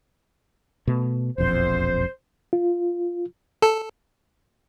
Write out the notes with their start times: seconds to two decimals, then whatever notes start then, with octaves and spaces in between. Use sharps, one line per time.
0.87 B2 A3
1.38 E1 A#1 F2 C5
2.53 F4
3.62 A4